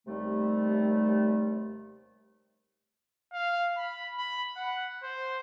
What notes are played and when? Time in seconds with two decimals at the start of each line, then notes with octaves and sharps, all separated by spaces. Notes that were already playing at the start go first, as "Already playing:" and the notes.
0.07 D#2 C3 G3 A3
3.33 F5
3.78 B5
4.17 B5
4.56 F#5
5.03 C5